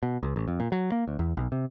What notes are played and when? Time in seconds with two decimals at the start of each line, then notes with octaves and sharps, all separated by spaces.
0.03 B2
0.23 C#2
0.36 A1
0.48 F2
0.60 A#2
0.72 F#3
0.92 A#3
1.08 D2
1.19 E2
1.37 B1
1.52 C3